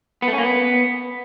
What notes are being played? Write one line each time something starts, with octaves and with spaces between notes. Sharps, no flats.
B3
A3
C#4
A#3
B3